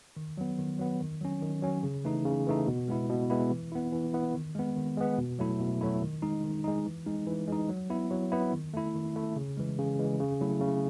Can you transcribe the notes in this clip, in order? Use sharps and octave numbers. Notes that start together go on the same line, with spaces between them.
D#3
F#3 B3
D#3
F#3 B3
D#3
F#3 C#4
D#3
F#3 C#4
C#3
E3 A3 D#4
C#3
E3 A3 D#4
B2
G#3 B3 E4
B2
G#3 B3 E4
E3
B3 E4
E3
B3 E4
D#3
G#3 B3
D#3
G#3 B3
B2
F#3 A3 E4
B2
F#3 A3 E4
D#3
G#3 D#4
D#3
G#3 D#4
E3
G#3 D#4
E3
G#3 D#4
F#3
B3 E4
F#3
B3 E4
D#3
A3 E4
D#3
A3 E4
C#3
E3 G#3
C#3
E3 G#3
C#3
F#3 A3 E4
C#3